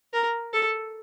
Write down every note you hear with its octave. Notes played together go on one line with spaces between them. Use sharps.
A#4
A4